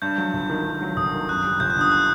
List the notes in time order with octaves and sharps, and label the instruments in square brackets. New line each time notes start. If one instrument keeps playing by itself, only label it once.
[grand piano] G2 [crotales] G6
[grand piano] F#3
G1
D#3
G2
F#3
[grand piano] G1 [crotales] D#6
[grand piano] D#3
[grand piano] F#2 [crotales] F#6
[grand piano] G3
[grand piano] G1 [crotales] G6
[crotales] F#6
[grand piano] D3 [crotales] D#6
[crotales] F#6